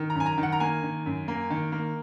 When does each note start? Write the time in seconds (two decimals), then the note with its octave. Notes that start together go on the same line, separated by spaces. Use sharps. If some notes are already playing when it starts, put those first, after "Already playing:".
Already playing: D#3
0.10 A#5
0.15 F#2 G#5
0.26 A#5
0.38 D#3
0.43 F#5
0.52 A#5
0.60 A#3 G#5
0.83 D#3
1.06 F#2
1.28 A#3
1.50 D#3
1.72 A#3